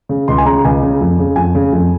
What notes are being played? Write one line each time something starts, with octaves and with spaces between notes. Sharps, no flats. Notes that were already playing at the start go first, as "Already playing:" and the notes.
C#3
C#2 C6
G#5
C#3 A#5
C#2 G#5
C#3
F2
C#3
F2 G#5
C#3
F2